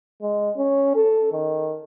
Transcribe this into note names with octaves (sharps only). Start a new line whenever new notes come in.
G#3
C#4
A4
D#3